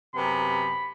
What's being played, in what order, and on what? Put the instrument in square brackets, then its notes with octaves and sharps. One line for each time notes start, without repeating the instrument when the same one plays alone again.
[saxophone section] F#2 C3 B3 [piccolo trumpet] B5